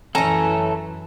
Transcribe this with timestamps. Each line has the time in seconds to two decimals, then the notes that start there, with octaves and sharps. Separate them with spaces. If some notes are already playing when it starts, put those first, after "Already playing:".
0.15 F#2 E3 A3 C#4 A4 A#5